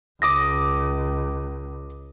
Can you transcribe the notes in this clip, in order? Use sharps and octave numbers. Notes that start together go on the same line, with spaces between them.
C#2 D6 D#6 A#6